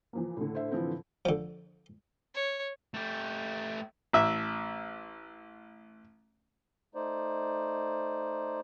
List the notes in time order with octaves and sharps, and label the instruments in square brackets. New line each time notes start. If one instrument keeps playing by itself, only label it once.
[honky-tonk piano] E3 F3 A#3
A2 D3
[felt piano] C5 E5
E3 F3 C4
[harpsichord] D3 F3
[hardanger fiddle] C#5
[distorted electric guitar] A3 G4
[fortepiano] A1 E5
[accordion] A3 D#4 C5 D5